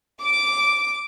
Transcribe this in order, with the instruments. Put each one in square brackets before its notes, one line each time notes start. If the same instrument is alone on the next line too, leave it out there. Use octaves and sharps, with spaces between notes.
[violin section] D6